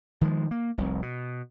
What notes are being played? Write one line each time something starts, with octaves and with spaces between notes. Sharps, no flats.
D#3 F3 G#3
A#3
F1 C2
B2